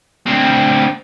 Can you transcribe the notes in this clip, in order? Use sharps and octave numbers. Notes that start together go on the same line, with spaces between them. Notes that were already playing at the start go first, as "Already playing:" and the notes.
D2 C4